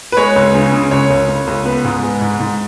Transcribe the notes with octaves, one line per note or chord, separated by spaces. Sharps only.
B4
G#3 C#5
C#2
C#3
C#3
C#2 C#5
C#2
C#2
C#2
B3 B4
G#2
G#3
G#2
G#2